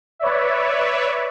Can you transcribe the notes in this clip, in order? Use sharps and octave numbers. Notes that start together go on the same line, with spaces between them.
B4 C#5 D5 E5